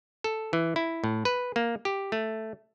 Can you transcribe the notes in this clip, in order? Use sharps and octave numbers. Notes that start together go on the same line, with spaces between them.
A4
E3
E4
A2
B4
A#3
G4
A3